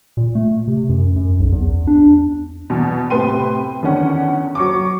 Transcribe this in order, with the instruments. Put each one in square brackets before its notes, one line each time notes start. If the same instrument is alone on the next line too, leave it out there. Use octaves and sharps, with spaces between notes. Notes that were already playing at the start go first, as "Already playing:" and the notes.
[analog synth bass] A#2
A3
C3
F#2
F#2
B1
E2
D4
[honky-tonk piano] E2 B2
A2 C3 B4 G5 C6 D#7
E2 D3 D#3 C#4 F#5
F#3 C#6 D6